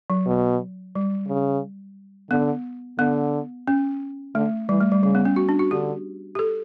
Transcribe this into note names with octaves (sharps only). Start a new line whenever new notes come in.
F#3
B2
G3
C#3
D3 B3
D3 B3
C#4
D3 A3
E3 G3
A3
G3
C#3 G3
B3
C#4
F#4
D4
F#4
D3 G4
G4
A4